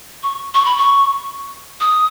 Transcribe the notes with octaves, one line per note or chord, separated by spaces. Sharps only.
C#6
C#6
B5
C#6
D#6